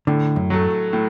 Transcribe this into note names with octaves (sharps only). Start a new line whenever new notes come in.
A2 D3
F#2
F#3 A3
A2